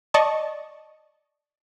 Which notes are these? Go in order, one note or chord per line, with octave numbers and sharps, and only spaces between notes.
D5 D#5 A5 C#6